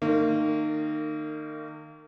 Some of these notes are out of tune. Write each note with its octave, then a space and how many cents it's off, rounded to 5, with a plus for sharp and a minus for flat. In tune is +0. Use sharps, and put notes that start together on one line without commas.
D#3 -25 A#3 -35